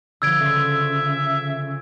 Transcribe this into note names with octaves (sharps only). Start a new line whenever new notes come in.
D3 F3 E6 G#6 D7
C#3 A4 E5 C6